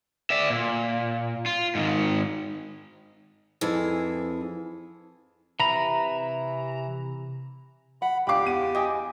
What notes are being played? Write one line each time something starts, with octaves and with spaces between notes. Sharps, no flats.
D5 E5
A#2
F4
G#2 D#3
F2 E3 G#4
C3 E3 A#5 B5
F#5 B5
C#2 D4 G4 F5 G5 B5 D6
E2 F#5 D#7
D#5 G5 G#5 D6 D#6